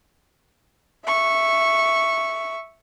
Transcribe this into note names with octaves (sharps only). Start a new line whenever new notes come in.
E5 C#6